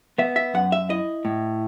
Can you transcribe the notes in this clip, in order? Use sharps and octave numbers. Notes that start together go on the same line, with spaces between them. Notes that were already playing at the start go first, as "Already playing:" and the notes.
B3 E5
E5
F#2 F#5
E5
E4 D#5
A2